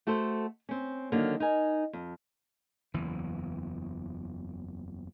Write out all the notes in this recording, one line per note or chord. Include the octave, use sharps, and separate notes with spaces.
A3 F#4 A4 C5
C4 C#4
D3 D#3 F#3 A#3
D#4 A#4 G#5
F2
F#1 E2 E3